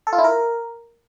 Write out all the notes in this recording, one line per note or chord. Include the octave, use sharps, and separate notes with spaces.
A4
F4
E4
A#4